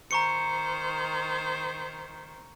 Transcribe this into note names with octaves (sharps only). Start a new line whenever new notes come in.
D#3 C5 A#5 C#6 C#7